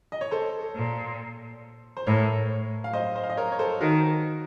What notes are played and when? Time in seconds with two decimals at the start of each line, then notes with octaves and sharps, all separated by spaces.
0.12 D#5
0.21 C#5
0.31 A4 C5
0.76 A#2
1.97 C5
2.07 A2 A#4 C#5
2.84 F5
2.93 C5 D#5
3.16 C5 D#5
3.23 F5
3.30 D#5
3.37 A#4 C#5
3.52 C#5
3.59 A4 C5
3.81 D#3 F#4 A#4